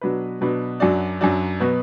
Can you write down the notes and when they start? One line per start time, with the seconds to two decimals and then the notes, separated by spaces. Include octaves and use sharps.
0.01 B2 F#3 D4 B4
0.41 B2 F#3 D4 B4
0.80 F#2 F#3 D4 F#4 D5
1.21 F#2 F#3 D4 F#4 D5
1.60 B2 F#3 B3 F#4 B4